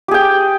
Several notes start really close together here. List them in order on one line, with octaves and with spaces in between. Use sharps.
G4 G#4 G5